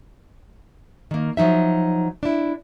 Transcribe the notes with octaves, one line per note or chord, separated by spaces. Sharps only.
D#3 A#3
F3 F#3 D#4 E5
D4 E4